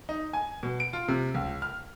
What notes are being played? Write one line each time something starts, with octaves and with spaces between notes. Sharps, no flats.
D#4
G#5
B2
D7
F4
C3
C#2
F6